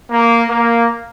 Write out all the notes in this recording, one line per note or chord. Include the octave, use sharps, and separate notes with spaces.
A#3
A#3